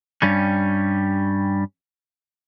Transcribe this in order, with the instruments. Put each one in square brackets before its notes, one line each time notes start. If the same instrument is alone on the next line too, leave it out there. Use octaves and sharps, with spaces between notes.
[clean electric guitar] G2 G3 C#4